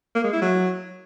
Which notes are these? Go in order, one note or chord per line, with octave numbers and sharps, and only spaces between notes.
A#3
G#3
E4
F#3